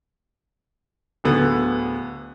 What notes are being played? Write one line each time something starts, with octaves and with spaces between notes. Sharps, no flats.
D1 D3 B3